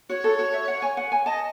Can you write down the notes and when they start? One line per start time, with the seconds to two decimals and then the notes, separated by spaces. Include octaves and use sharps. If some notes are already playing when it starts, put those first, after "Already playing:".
0.09 F#4 C#5
0.24 A4
0.39 F#4
0.54 E5
0.68 F#5
0.82 G#5
0.97 F#5
1.12 G#5
1.26 D#5 A5